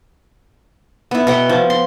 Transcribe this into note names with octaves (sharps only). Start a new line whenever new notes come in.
B3 E4
B2 F#5 G5
F3
C6